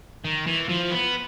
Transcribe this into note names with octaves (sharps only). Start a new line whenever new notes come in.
D#3
E3
F3
B3